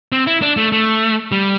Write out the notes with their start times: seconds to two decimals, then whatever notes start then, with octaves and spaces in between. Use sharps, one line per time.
0.12 C4
0.27 E4
0.42 D4
0.57 A3
0.72 A3
1.32 G3